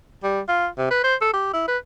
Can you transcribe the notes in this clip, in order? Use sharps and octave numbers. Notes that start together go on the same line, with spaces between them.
G3
F4
C3
B4
C5
A4
G4
E4
B4